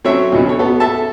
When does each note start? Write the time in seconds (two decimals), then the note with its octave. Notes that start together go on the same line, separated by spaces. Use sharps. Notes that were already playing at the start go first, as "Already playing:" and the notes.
0.04 F#3 A3 C4 C#4 C#5 E5
0.32 D2 B2 C#4
0.46 A4 C#5
0.59 B3 A4
0.80 A4 E5 A5